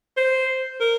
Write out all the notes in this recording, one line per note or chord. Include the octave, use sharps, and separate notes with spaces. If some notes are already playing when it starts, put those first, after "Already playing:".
C5
A#4